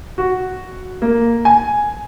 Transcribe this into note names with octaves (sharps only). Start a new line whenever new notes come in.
F#4
A#3
G#5